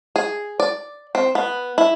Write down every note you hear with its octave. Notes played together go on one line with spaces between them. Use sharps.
G#4
D5
C4
B3
E4